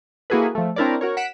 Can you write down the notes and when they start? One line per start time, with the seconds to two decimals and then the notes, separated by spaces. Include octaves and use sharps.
0.30 A#3 E4 F#4 G#4 A4 B4
0.55 F3 A3
0.76 C4 D4 E4 A#4 C#5 D5
1.01 F#4 A#4 C#5
1.17 F#5 B6 D7 E7